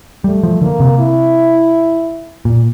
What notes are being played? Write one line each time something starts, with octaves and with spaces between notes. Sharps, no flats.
G3 A3
F3
D3 A#3
C3
E4
A#2